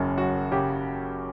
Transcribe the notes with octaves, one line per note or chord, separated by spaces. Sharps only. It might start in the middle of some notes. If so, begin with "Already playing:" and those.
Already playing: F#1 F#2
F#3 F#4
C#3 G4